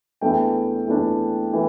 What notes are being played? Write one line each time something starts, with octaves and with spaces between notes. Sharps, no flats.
E2 E3 A3 D4 G5
E2 E3 A3 D4
E3 A3